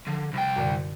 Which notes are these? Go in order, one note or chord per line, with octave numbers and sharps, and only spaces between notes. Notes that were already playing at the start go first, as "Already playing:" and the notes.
D3 F3
C2 G5
F#2 A#2 D3